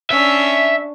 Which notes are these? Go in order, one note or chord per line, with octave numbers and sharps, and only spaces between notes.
C#4 D4 E5